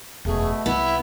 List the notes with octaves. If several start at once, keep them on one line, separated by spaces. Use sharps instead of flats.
E1 F#2 B2 A3 G#4
C2 B3 E4